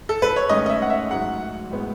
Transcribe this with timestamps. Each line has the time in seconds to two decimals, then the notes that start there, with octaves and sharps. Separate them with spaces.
0.09 A4
0.22 B4
0.36 C#5
0.49 G#2 D#3 A3 C#4 D#5
0.66 D#5
0.70 E5
0.82 F#5
0.90 E5
1.11 G#2 F#3 A3 C#4 F#5
1.71 A2 G#3 B3